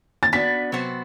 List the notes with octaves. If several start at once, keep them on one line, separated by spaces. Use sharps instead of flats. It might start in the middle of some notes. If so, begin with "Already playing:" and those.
A6
B3 D4 F#4 B4 B6
C3 F#3 B3 F#4 C5